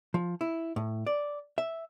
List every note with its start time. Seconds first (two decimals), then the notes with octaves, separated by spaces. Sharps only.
0.14 F3
0.41 E4
0.76 A2
1.07 D5
1.58 E5